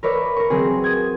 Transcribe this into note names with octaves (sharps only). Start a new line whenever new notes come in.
A#4 B4 C#5 D5 E5
A#4 C#6
F#3 C4 G#4
D#6 G#6